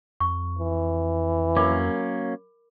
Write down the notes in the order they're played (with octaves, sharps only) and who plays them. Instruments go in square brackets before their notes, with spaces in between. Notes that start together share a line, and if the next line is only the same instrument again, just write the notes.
[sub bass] F2 [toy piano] C#6
[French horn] E3
[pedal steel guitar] F#3 A#3 C#4 [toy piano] A#4 B5 D6